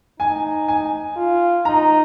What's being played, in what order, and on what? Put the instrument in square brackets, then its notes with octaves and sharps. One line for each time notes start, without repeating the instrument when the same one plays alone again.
[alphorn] D#4 [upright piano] G#5
[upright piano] G#5
[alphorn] F4
[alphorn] D#4 [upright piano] A#5